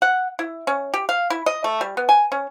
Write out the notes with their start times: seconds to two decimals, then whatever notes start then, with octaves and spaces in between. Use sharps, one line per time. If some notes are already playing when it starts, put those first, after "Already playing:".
0.02 F#5
0.39 E4
0.67 C#4
0.94 G4
1.09 F5
1.30 E4
1.46 D#5
1.64 A3
1.81 G3
1.97 B3
2.09 G#5
2.32 C#4